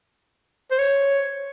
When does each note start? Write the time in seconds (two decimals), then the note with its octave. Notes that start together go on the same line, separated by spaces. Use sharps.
0.72 C5
0.79 C#5